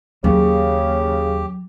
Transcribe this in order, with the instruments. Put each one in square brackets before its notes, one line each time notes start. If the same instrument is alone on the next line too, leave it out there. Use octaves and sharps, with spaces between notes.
[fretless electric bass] D#2 A#3 C#4 [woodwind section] C#3 [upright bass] F#3 [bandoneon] G4